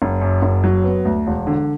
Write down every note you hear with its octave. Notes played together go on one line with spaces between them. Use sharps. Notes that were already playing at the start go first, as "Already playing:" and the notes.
F#1
F#2
F#1
F#3
B3
D2
E1
D3